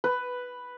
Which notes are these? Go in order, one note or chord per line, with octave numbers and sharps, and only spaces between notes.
B4